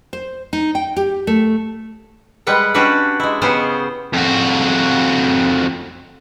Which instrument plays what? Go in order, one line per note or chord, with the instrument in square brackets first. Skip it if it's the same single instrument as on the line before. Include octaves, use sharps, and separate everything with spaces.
[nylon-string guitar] C5
D#4
G5
G4
A3
[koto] G3 G#3 B4 F#5 G5
C#4 D4 F#4 G4 B4
G#3 E4
C#3 B3 C#4 G4 G#4 C5
[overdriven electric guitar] F2 F#4